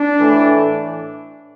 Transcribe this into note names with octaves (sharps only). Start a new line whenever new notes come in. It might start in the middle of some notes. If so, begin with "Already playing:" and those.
Already playing: D4
A2 E3 A3